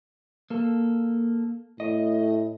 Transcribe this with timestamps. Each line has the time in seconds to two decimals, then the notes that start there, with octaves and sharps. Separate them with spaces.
0.50 A#3 A4
1.80 A2 D#5